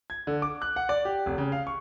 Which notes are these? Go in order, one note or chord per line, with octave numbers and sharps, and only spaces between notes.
G#6
D3
D6
F#6
F#5
D5
G4
F1
C#3
F5
C#6